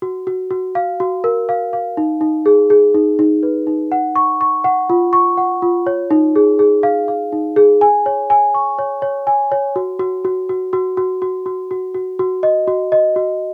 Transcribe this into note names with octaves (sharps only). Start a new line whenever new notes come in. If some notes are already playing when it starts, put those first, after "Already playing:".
F#4
F#4
F#4
F5
F#4
A#4
F5
F5
D#4
D#4
G#4
G#4
D#4
D#4
B4
D#4
F#5
C#6
C#6
F#5
F4
C#6
F#5
F4
C#5
D#4
G#4
G#4
F5
F5
D#4
G#4
G#5
C#5
G#5
C#6
C#5
C#5
G#5
C#5
F#4
F#4
F#4
F#4
F#4
F#4
F#4
F#4
F#4
F#4
F#4
D#5
F#4
D#5
F#4